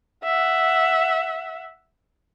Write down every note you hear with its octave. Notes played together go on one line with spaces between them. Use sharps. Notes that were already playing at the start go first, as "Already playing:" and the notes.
E5 F#5